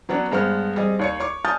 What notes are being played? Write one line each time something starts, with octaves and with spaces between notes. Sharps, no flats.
F#3 B3 C#4 D4
G2 G#3 B3 C5 F6
G3 C4 G#4 D#5
D#2 C#5 C#7
C#5 C#6 D6
G#5 A5 D#6 F6 G6 A6